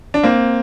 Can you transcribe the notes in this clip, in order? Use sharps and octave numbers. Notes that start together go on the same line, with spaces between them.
D4
A#3 C4